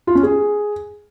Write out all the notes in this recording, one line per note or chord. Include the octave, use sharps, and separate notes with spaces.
F4
C#4
G#4